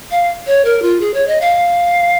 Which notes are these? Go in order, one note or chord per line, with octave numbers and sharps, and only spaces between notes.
F5
C#5
A#4
F4
G#4
C#5
D#5
F5